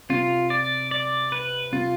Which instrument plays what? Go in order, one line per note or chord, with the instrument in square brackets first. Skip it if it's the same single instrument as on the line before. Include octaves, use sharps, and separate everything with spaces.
[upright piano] C3 [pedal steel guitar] F4
[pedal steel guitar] D5
D5
B4
[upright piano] C3 [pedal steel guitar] F4